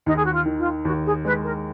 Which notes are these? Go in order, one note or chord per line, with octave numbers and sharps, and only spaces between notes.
D#2 D#4
G#4
F#4
F4
D#3
F4
D#2 F#4
G#4
G#3 B4
A#4